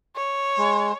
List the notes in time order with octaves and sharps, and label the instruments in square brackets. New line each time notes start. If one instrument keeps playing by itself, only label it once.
[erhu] C#5
[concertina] G#3